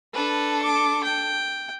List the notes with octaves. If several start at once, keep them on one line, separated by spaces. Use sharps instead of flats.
D4 A4 B4
D6
G5